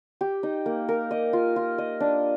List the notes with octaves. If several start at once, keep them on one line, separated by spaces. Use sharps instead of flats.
G4
D#4
A#3
A#4
D#5
F4
F4
D#5
D4